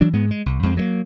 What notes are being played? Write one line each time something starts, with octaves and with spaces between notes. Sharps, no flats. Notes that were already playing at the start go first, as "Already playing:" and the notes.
E3 F#3 D4
G#2 G#3 B3
G#3
C2
F2 G#3 C4
F#3 A3 A#3